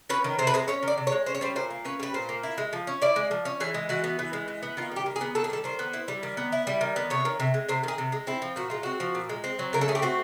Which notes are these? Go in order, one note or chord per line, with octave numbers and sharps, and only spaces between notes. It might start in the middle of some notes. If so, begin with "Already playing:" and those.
C#4 B4
D#3
C3 C5
B4
G#3 C5
C#4 C#5
D#3 D5
C3
C#5
G#3
C#4 C5
C#5
G3 C5
A#2 C5
A#3
C#4 B4
G3 B4
A#2 C5
A#3
E4
G#3
F3
C#4
E4 D5
G#3
F3
C#4
E3 G#4
G#3
E3 F#4
B3
E3
G#3
E3
B3
D#3 F4
G3 G4
D#3
G#4
B3
D#3 A4
G#4
G3 A4
D#3 C5
B3
E4
G3
D#3
B3
E4
G3
D#3
B3
C3 C#5
D#3
C3
G#3
C3 C5
D#3 G#4
C3
G#3
C4 E4
F3
A#2 F#4
G#3 F4
C4 F#4
F3
A#2
G#3
C4
F#3
C#3 A#4
A4
A3 G#4
G4
C4 F#4